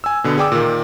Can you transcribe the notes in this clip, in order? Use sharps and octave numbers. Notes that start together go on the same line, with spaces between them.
G#5 E6
B2 D3 B3
G#4 D5 G5 D6 E6
A#2 D#3